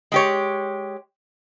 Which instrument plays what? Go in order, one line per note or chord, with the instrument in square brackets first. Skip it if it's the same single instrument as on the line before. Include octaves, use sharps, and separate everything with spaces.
[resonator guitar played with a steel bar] G#3 G4 C#5